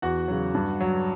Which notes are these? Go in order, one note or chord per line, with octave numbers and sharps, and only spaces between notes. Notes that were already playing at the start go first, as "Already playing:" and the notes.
E2 F#4 F#5
C#3 F#3
G2
F#3